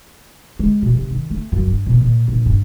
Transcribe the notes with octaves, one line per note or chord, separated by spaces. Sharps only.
G#3
B2
C3
D#3
A3
F#2
G2
B2
A#2
A#1
G2